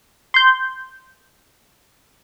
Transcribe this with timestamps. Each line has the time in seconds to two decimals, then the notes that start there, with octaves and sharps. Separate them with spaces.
0.34 C6 G6